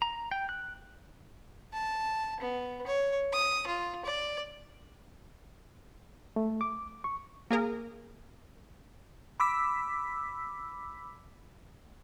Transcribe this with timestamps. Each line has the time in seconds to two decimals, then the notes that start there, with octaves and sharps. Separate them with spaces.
0.02 A#5
0.32 G5
0.49 F#6
1.73 A5
2.40 B3
2.87 C#5
3.33 D#6
3.67 F4
4.05 D5
6.36 A3
6.61 D6
7.04 C#6
7.51 A#3 G#4 A#4
9.40 B5 D6 E6 B6